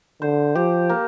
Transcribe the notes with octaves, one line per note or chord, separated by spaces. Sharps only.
D3 C5
F3 G4
A#3